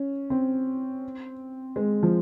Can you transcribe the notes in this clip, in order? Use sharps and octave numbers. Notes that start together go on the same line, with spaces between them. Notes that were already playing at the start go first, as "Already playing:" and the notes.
Already playing: C#4
C4
G#3
F3